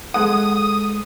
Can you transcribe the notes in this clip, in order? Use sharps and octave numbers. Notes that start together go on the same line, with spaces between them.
G#3 A4 F#5 D#6